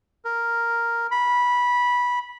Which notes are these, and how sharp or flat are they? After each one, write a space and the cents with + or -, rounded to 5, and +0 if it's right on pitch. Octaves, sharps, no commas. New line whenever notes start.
A#4 +0
B5 -15